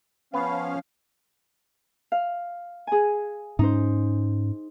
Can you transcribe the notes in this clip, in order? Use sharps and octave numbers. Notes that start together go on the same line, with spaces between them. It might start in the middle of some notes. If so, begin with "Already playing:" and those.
F3 B3 C#4 B4 F5
F5
G#4 G#5
G#2 C#4 D#4 C5